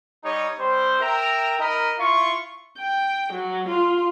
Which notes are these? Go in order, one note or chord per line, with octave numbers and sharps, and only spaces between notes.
G3 D#4 C#5 D#5
G3 C4 C5
A#4 E5 G5 A#5
D#4 A#4 D#5 B5
E4 F4 C#6
G5
F#3
F4